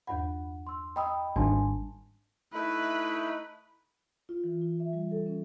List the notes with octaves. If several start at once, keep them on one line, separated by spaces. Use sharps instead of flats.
E2 G2 F#5 B5
C6 E6
D#5 G5 A#5 B5 D#6 E6
G#1 G3 D4 G#5 A5 C6
A3 D#4 E4 B4
F4
E3
F4
E5
G3
A4
C#4